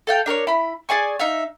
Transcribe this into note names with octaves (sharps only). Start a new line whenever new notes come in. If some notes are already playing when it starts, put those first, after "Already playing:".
A4 F5 G5
D4 A#4 C5 C#5
E4 B5
G#4 D5 G#5 C#6
D#4 E5 F5